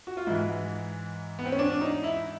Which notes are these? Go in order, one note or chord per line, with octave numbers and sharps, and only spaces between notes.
F#4
F4
G#2 E3 E4
B3
C4
C#4
D4
D#4
E4